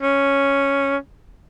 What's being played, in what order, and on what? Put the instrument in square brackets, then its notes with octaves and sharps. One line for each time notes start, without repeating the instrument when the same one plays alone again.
[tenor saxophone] C#4